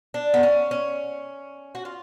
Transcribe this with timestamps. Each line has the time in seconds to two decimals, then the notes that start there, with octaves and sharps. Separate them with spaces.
0.14 D4
0.34 B3
0.43 C#4
0.71 C#4
1.75 F#4
1.85 F4